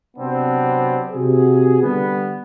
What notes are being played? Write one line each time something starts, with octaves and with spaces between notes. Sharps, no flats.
C3 F#3 B3 C4 D4
C3 F#4 G#4
D3 G3 B3